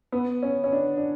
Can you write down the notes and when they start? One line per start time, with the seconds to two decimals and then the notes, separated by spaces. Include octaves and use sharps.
0.12 B3
0.42 C#4
0.64 C#4
0.73 D4
0.97 D4